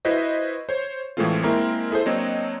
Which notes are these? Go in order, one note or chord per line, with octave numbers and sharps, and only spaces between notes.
E4 F#4 B4 C5 D#5
C5 C#5
A2 E3 G#3 A3 C4 F4
G#3 A#3 C4 E4 A#4 C6
E4 G#4 A4 C5
F#3 A#3 C4 D4 C#5 D#5